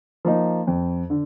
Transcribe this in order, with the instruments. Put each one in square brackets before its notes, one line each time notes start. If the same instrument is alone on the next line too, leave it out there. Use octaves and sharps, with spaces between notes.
[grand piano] F3 A#3 D#4
F2
D3